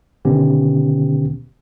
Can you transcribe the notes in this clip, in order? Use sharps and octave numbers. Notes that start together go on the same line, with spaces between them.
B2 D3 D#3 B3 C#4 G4